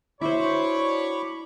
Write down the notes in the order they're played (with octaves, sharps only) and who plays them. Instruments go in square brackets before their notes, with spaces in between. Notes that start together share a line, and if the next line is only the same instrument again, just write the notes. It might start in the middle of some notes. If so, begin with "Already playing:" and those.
[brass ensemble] D4 F#4 C#5 [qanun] E4 C5 [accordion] B5 C#6 D6